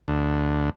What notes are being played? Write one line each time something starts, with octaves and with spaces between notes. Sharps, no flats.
D2